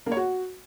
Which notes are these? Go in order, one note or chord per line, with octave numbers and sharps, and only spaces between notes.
A#3
C#5
F#4